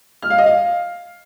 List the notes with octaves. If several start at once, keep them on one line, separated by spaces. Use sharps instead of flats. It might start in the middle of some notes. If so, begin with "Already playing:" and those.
F6
F5
D#5
F5